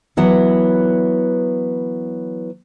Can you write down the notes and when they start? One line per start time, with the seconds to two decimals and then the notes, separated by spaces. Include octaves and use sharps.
0.17 E3 F#3 B3